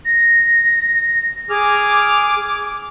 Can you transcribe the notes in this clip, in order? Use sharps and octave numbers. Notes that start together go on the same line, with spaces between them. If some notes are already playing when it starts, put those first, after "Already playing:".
A#6
G#4 D6 F6